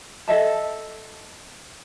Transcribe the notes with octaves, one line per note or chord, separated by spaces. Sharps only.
A4 D#5 E5 A5